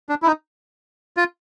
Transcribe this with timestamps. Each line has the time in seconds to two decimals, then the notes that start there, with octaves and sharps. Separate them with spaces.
0.09 D4
0.22 E4
0.27 D#4
1.17 F4